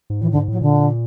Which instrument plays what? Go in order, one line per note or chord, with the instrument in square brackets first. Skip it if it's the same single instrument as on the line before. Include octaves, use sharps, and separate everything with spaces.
[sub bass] G#2
[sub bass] A2 [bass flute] E3
[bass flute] D3
[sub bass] G#2
[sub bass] A2 [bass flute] F#3
[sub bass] A#2 [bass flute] D3